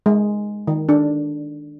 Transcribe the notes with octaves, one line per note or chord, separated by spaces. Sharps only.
G#3
D#3
D4